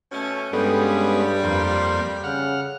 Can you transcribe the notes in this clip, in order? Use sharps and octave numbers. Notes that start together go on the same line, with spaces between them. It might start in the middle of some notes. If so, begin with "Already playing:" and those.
B2 A3 C#4
G2 G3 G#3 B3 C#4 A4
F2 A#3 C5
C#3 F#5 F6